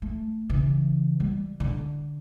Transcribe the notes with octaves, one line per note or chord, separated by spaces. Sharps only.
A3
C#3 E3
G3
D3